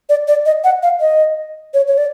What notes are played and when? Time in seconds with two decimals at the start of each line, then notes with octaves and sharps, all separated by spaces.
0.09 D5
0.28 D5
0.46 D#5
0.64 F#5
0.83 F5
1.01 D#5
1.74 C#5
1.88 C#5
1.98 D5